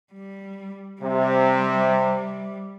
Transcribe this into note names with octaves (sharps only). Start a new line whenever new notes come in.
G3
C3 G3